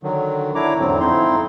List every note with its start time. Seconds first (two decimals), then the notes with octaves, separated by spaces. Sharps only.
0.03 D3 D#3 F#3
0.55 D4 E4 C#5 A#5 D6
0.79 E2 G#2 D3 F#3 C4
1.00 F2 C4 D#4 E4 C6